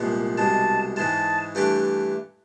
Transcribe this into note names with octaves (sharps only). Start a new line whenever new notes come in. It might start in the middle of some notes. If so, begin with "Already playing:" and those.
Already playing: C2 A#2 F3 G#3 B3
C2 B2 G#3 A5
G#2 E3 G#3 A5
G2 E3 A3 D4 G4